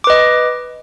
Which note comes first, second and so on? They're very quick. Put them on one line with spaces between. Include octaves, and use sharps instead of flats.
D6 B4 D#5